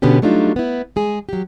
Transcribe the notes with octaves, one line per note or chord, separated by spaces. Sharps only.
B2 D3 B3 C#4 G4
F#3 G3 A3 D4 D#4 F4
B3 E4
G#3 G#4
F#3 G4